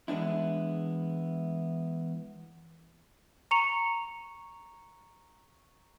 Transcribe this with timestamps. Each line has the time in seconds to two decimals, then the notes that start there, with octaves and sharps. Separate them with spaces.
0.08 E3 G#3 B3 D4 E4
3.51 A#5 C#6 C#7 F7